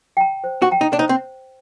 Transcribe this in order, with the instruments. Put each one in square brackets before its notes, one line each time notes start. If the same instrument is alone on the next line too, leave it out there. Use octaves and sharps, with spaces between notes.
[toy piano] G5 A#5
C5
[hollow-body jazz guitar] F#4
[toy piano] G5 A#5
[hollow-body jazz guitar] D#4
D4
[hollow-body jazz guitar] D#4 [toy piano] C5
[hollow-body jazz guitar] C4